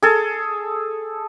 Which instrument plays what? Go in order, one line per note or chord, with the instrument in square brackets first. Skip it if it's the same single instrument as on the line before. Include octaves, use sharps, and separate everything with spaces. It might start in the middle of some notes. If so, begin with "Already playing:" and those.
[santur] G#4 A4